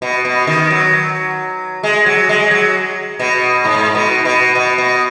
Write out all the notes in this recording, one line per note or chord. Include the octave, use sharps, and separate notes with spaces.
B2
B2
D#3
F#3
G#3
F#3
G#3
F#3
B2
G#2
B2
B2
B2
B2